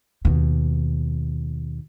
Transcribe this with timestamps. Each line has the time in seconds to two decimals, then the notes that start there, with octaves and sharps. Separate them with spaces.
0.25 D#2 B2